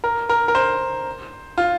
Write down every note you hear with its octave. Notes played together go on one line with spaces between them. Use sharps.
A#4
A#4
A#4
C5
F4